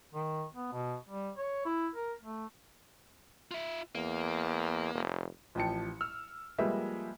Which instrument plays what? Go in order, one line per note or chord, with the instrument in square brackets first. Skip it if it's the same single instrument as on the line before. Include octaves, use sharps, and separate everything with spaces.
[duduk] D#3
B3
B2
G3
C#5
E4
A#4
A3
[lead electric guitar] F4 E5
[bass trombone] E2 [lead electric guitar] A#3
[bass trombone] F1
[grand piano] A1 F3 G5 A5 C#7
E6 F6
F3 G3 G#3 A#3 B4 E5